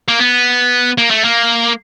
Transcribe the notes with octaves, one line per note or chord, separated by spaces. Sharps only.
A#3
B3
A#3
A3
A#3